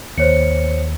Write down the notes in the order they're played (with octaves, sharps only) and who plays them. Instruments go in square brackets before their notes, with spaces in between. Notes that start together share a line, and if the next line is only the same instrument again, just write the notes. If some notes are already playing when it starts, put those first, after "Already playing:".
[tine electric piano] D#2 [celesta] C5 C#5 C#7